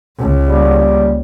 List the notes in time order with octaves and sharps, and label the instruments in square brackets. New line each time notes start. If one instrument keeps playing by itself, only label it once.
[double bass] C#2
[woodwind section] G3 A#3